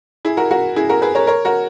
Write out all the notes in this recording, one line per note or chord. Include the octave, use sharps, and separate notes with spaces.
E4 G#4
F#4 A#4
F#4 A#4
E4 G#4
F#4 A#4
G#4 B4
A#4 C#5
A#4 C#5
F#4 A#4